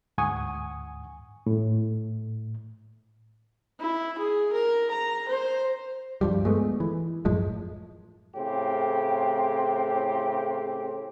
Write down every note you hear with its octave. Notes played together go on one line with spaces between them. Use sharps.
D2 G#2 F#5 G#5 C#6 D#6
A2
E4
G#4
A#4
A#5
C5
G2 F3 G3
G#3 A3 B3
E3
F#2 A2 F3 G#3
A2 C#3 C4 G4